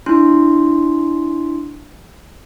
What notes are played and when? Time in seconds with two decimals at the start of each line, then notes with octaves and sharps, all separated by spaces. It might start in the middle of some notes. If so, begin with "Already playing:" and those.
0.06 D4 E4 C6